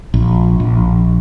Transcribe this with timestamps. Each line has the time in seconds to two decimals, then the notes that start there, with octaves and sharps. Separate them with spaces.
0.14 A#1
0.60 A#1